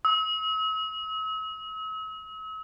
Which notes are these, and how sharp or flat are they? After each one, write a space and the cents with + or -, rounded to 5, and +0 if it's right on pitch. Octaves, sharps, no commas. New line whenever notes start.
E6 -45